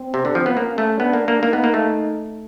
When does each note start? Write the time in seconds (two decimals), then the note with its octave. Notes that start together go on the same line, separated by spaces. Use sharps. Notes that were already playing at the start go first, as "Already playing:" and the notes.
Already playing: C4
0.14 C3
0.25 D3
0.35 F3
0.46 B3
0.56 A#3 C#4
0.78 A3
1.00 B3 D4
1.13 A#3
1.28 A#3
1.42 A#3 D#4
1.53 B3
1.64 A#3
1.74 A3